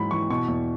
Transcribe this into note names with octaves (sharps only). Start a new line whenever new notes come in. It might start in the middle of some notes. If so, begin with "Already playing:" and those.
Already playing: G#2 E3 F#3 B5
E3 C#6
B2 C#6
E2